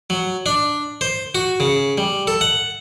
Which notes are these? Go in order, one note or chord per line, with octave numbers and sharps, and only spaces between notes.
F#3
D4
C5
F#4
C#3
G3
A4
F#5